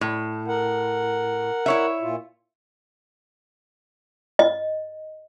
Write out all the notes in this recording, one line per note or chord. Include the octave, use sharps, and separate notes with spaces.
A2
A#4 F#5
E4 C#5 E5
A#2 F4
D#5